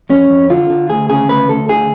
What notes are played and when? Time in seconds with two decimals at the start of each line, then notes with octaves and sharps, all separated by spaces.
0.10 F2 C#4
0.30 F2
0.50 D3 F4
0.70 D3
0.89 D2 G#4
1.09 C#3 G#4
1.29 D2 B4
1.49 D2 A4
1.69 D3 G#4